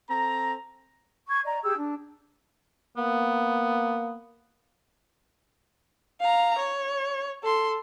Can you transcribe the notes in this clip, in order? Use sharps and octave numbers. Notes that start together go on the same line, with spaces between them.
C4 A4 A#5
C#6 G#6
D5 D#5 A#5
G4 G#4 E6
D4
A#3 B3
F5 A#5
C#5
A4 C6